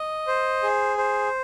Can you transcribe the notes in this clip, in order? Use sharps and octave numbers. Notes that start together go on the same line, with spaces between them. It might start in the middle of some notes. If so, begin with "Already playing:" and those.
Already playing: D#5
C5
G#4
C5